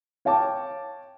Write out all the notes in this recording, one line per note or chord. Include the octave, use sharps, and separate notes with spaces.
C#5 F5 G5 A5 D6